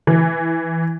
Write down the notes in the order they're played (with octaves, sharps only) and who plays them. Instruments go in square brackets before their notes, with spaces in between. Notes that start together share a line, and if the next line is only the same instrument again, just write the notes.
[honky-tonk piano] E3